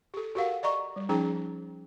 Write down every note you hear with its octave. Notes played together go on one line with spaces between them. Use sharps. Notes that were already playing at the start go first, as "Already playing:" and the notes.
G4 A4
F#4 G4 A#4 F5 F#5
D5 D#5 A#5 C#6
G3
F3 C#4 D#4 G#4 A#5